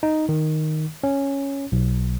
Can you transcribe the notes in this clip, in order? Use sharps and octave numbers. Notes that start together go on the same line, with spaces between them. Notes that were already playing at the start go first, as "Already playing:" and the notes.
D#4
D#3
C#4
B1